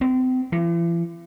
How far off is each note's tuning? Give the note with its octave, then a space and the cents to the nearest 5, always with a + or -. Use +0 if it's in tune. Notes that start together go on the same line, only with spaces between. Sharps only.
C4 -35
E3 +45